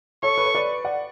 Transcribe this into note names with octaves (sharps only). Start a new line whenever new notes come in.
A4 C#5 C#6
B4
C#5
B4 D5
D5 F#5